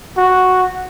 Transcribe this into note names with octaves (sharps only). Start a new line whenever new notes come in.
F#4